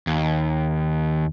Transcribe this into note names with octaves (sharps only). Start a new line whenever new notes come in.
D#2